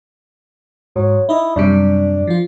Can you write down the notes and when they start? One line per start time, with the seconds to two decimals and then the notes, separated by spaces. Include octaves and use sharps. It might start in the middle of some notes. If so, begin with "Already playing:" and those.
0.96 G#2 F#3
1.29 D#4 E4 D#5
1.56 F#2 C3 G3 D4
2.27 F3 F4